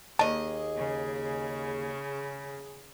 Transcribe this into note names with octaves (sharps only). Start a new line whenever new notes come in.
D#2 G#4 D#5 A5
C#3